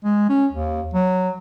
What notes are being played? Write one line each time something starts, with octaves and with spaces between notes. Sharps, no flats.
G#3
C#4
D#2
F#3